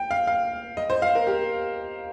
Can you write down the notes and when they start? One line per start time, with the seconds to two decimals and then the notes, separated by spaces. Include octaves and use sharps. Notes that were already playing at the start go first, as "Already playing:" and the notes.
Already playing: G5
0.11 F5
0.27 F5
0.77 D#5
0.90 C5
1.02 F5
1.15 A#4
1.27 G4